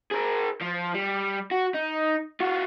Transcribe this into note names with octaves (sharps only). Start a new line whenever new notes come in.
G#4 A#4
F3
G3
F#4
D#4
F4 F#4